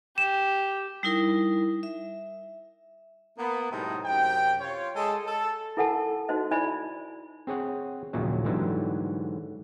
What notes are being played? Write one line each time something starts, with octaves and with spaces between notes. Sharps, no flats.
G4 E7
G3 D#4 E4 A#4
E5
A#3 B3
A2 C3 F#3 G#3 D#4
F#2 C3 G5
F4 C#5
G#3 A4
A4
E4 A4 A#4 F#5 G#5 A5
D#4 F#4 C5 D#5
E4 C5 D5 D#5 G#5 B5
C4 G#4 C#5 F#5
A#1 D#2 A#2 C#3 F#3
G#2 D3 E3 F#3 G3